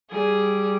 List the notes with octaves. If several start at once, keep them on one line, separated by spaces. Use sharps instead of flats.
G3 G#4